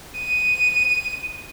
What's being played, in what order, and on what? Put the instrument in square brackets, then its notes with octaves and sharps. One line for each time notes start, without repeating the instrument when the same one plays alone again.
[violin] D#7